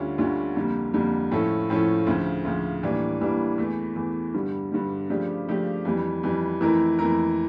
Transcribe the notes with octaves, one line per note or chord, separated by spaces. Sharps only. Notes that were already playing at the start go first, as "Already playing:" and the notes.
Already playing: D2 D3 G3 C#4 F4
D2 D3 G3 C#4 F4
F2 D3 G3 A#3
F2 D3 G3 A#3
A2 F3 C#4 E4 A4
A2 F3 C#4 E4 A4
D2 C#3 F3
D2 C#3 F3
A2 E3 G3 A#3 D4
A2 E3 G3 A#3 D4
E2 E3 A3
E2 E3 A3
G2 D3 G3
G2 D3 G3
C#3 F3 A3 D4 G4
C#3 F3 A3 D4 G4
F2 E3 G3
F2 E3 G3
F2 E3 A3 E4 A#4
F2 E3 A3 E4 A#4